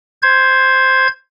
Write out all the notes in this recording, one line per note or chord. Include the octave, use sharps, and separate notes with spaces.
C5 G#6